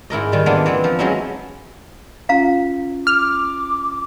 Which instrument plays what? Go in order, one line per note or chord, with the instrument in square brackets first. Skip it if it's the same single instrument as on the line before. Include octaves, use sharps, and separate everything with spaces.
[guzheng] G#2 E4 A#4 D#5
D#3 G3
E3 A#3 B3 D4 F4
E3 B3 C4
F3
F3 F#3 G#3 C#4 D#4 E4
[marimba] C#4 F4 [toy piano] F5 A#5
[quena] D6 [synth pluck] F6